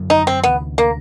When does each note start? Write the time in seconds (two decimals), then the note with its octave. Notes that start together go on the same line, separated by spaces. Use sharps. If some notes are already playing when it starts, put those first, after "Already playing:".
Already playing: G#1 F#2 D3 F#3
0.10 D#4
0.27 C4
0.43 D2 C3 E3 B3
0.78 A#3